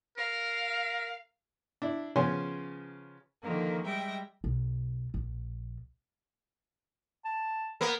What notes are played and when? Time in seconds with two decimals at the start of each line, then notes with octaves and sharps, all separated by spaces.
0.17 A#4 F5
1.82 D4 E4
2.16 C#3 F3 B3 C#4 G#5 C6
3.42 D3 D#3 F3 A#3
3.84 G3 G#3 E5 G5 A#6
4.44 B1
5.14 A#1
7.25 A5
7.81 A#3 B3